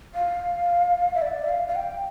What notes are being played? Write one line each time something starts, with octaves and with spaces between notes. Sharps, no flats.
F5
E5
D5
E5
F5
F5
G5